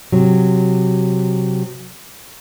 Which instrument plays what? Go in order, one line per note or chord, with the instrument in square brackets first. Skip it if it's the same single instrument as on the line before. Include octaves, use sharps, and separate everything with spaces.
[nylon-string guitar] C3 F#3